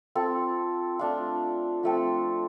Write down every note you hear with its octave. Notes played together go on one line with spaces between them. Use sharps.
C4 F4 A4
A3 D4 F4
F3 A3 C4